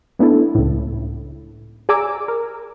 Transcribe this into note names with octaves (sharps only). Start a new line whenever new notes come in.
A3 B3 D4 E4 A4
C#2 A2
G#4 D5 G#5 A#5 D6 E6
A#4